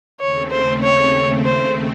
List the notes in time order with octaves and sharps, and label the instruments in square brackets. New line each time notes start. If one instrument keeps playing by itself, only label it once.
[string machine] D#2 C#3 A3 C4 [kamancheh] C#5
[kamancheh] C5
C#5
C5